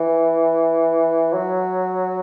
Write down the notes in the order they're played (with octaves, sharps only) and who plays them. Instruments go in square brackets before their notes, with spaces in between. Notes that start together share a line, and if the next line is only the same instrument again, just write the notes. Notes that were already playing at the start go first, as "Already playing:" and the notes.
Already playing: [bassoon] E3
F#3